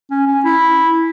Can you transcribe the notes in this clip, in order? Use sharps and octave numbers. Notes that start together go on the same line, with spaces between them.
C#4
C#4
E4